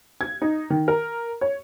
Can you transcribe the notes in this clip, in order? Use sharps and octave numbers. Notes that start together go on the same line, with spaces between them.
G#6
D#4
D#3
A#4
C#5